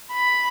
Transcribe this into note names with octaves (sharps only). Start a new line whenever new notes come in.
B5